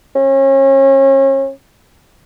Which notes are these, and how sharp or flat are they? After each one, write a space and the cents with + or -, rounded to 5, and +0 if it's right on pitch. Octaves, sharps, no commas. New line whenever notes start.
C#4 -35